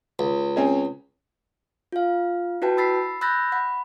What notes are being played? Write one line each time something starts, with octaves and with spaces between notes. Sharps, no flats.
C#2
C4 C#4 G#4
F4 F5
E4 F#4 B4 G5 A5
B5 E6 A6 B6 C7
B5 E6 F#6 G6 A6 A#6
F#5 B5